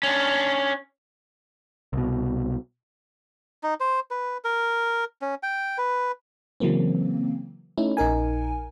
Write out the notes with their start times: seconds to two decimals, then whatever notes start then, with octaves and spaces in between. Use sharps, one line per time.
0.03 C#4 D4
1.93 C2 B2
3.63 D#4
3.80 C5
4.11 B4
4.44 A#4
5.22 C#4
5.43 G5
5.78 B4
6.60 C#3 E3 F#3 A#3 C4
7.78 A3 C#4 D#4 E4
7.97 A#1 D#4 A#4 G#5